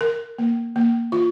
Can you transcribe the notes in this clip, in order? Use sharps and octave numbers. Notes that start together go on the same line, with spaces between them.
A#4
A#3
A#3
F4